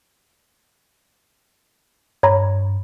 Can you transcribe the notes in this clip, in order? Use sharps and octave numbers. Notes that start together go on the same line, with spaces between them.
G2 C#5 A#5 B5